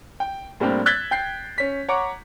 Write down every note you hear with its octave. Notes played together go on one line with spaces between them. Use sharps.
G5
A2 G3 A#3 C4 D4
E6 F#6 G#6 A6 B6 G7
G5 G6 C7
C#4 B6
C#5 F#5 A#5 C#6 D6